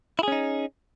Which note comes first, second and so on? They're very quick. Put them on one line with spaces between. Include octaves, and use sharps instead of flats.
E4 G#4 C#4 D#4